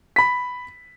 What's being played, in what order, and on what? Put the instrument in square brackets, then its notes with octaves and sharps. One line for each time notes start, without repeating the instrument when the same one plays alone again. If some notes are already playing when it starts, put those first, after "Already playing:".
[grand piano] B5 B6